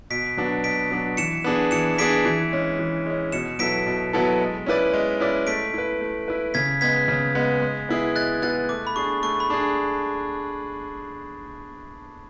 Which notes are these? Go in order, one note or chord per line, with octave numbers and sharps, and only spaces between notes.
B2 B6 D7
F#3 B3 D4 F#4
B2 B6 D7
F#3 B3 D4 F#4
E3 C#7 E7
B3 D4 G#4
E3 C#7 E7
B3 D4 G#4 B6 D7
E3
G#3 C#4
E3
G#3 C#4
B2 C#7 E7
F#3 B3 E4 A4 B6 D7
B2
F#3 B3 E4 A4
G#3
C#4 E4 B4 D5
G#3
C#4 E4 B4 D5
A3 B6 D7
E4 B4
A3
E4 B4
C#3 G#6 B6
G#3 B3 G#6 B6
C#3
G#3 B3
G#3
B3 E4 G#4
G#3 F#6 A6
B3 E4 G#4 F#6 A6
A3 D6
B5
D4 G#4 C#6
A3 C#6
B5
D4 G#4